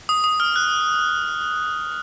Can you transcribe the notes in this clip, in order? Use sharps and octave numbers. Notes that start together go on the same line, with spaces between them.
D#6
D#6
F6
F#6